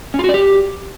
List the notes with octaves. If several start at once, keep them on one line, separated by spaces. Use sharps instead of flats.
C#4
F4
F#4
D5
G4